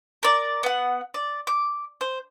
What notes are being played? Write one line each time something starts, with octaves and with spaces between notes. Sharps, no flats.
A#4 D5
B3 F#5
D5
D6
C5